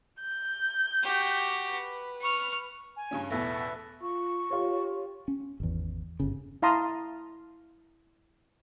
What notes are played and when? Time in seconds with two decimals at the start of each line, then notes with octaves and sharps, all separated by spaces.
0.21 G6
1.03 F#4 G4
1.72 B4
2.21 C#6 F6
2.96 G#5
3.11 G2 C#3 C#4
3.30 A1 E2 B2 A4 B4 E5 A#6
4.02 F4 C#6
4.51 F4 G4 C#5
5.28 C#4
5.60 G#1 E2
6.20 G1 C#3
6.62 E4 F5 A5 A#5 C6 D#6